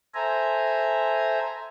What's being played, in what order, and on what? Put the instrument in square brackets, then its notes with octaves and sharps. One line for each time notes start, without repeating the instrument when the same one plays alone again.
[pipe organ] A4 C5 E5 G#5 A#5